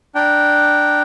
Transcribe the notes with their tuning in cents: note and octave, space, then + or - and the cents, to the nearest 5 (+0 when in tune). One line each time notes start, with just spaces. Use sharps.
D4 +5 G5 -15 A#5 +5